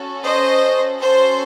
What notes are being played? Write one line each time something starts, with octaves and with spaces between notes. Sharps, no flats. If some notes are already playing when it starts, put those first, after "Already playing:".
Already playing: C#4 F#4 A4
C5 D#5
C#4 F#4 A4 C5